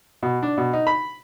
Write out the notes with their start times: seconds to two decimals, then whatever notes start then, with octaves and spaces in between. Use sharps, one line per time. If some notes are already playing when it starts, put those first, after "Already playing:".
0.23 B2
0.43 D4
0.58 B2
0.73 D#4
0.87 B5